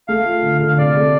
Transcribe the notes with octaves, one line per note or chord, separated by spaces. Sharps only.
A3 F5
F4
D3
D3
F5
C3 D5
A3